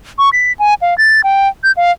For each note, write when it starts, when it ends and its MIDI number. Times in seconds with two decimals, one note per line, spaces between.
0.19 0.30 85
0.33 0.53 95
0.59 0.74 80
0.82 0.97 77
0.98 1.21 93
1.24 1.48 79
1.64 1.72 91
1.77 1.91 77